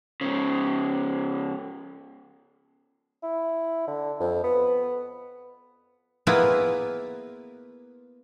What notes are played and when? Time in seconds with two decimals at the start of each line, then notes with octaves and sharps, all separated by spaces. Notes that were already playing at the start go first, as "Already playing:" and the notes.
0.21 G#2 C#3
3.23 E4
3.87 D3
4.20 F2
4.44 B3
6.27 A#3 B3 E4 F4 G#4 B4